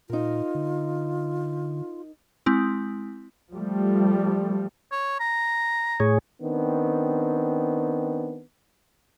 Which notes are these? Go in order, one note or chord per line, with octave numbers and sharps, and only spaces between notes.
A#2 D#4 F4 A#4
D3
G#3 C4 E4
F3 G3 A3
C#5
A#5
A2 G#4 C#5
D#3 B3 C4 D4